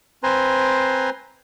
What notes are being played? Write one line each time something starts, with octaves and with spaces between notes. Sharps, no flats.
C4 B4 C5 G#5 A#5 C6